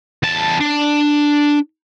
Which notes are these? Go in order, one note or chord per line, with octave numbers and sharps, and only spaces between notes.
E2 A5
D4